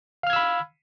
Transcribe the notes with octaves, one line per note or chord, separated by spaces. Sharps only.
F5 B5 E6 F6 G#6